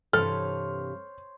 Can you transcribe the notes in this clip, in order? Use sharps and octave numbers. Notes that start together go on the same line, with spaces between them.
G2 C3 E3 A4 C5 C#5 F6